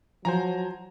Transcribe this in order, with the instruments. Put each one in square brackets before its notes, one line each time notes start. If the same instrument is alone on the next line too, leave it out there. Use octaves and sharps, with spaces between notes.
[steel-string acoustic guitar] F3 [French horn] F#3 [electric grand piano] C5 G#5 A#5